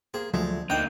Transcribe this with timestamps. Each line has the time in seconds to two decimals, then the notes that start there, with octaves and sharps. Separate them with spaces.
0.14 A#3 G#4 C5
0.34 D2 F3 F#3 G#3 A3
0.70 D2 A#3 D4 D#4 G5